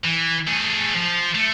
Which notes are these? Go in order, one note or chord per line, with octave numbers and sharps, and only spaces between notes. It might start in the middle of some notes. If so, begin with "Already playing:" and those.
E3
A3 G#4
F3
A3